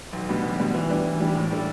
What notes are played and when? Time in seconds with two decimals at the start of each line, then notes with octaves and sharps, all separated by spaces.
0.13 B1
0.28 B2 G3 B3 D4
0.43 B1
0.59 B2 G3 B3 D4
0.75 E3
0.90 G3 D4 G4
1.05 E3
1.20 G3 D4 G4
1.35 A2
1.51 G3 D4 A4